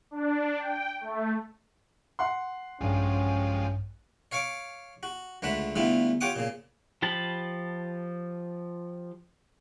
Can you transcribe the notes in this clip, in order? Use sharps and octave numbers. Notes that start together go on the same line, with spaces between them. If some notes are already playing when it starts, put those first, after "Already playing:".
D4
G5
A3
F#5 C6
A#1 G2 F3 G3 G#3 C#4
C#5 F5 C#6 D6
F#4
C#2 D3 A3 F#5 B5
D3 G3 A3 B3 E4 F4
F4 G4 C#5 F#5 D6 D#6
A#2 C#3
F3 G4 A5 B5